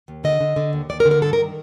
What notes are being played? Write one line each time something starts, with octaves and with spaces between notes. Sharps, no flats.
D#2
D3 D#5
D3
D3
D#2
D#2 D5
A#4
D3
A#4
G2 A4
A#4
D#3